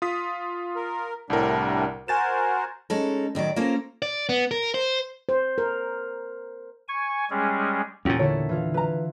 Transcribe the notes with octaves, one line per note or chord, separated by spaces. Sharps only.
F4 D#6 B6
A#4
C2 A2 G3 D4 E4 A#4
F#4 A#4 C5 G#5 A6 E7
G#3 C#4 D#4 A4
A2 D#3 F#3 D5
A#3 C#4 F4 A4 A#4 C5
D5
B3
A#4
C5
C5
A#4
G#5 C#6
G3 G#3 C#4 G#4
E2 A#2 C#4 G4
D3 E4 A#4 C#5
E3 F4
B4 A#5